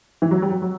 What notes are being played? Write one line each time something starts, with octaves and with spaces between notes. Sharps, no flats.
E3
F#3
G3
F#3
F#3